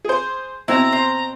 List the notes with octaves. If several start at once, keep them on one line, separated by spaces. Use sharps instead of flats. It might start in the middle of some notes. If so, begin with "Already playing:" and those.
G#4 C5
B2 C4 E4 A#5
C5